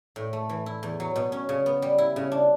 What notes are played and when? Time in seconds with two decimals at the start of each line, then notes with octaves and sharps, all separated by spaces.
0.16 A2
0.33 A3
0.49 E3
0.66 E4
0.83 E2
1.00 F#3
1.16 B2
1.32 C#4
1.49 C#3
1.66 B3
1.82 G3
1.98 E4
2.16 C#3
2.32 D4